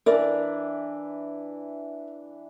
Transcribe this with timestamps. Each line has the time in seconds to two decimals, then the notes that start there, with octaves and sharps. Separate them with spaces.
0.06 E3 D4 A#4 D5